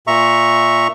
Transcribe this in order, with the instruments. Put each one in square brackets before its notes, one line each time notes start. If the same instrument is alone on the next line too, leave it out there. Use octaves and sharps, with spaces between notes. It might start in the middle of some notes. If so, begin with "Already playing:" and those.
[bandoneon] A#2 E5 A#5 C#6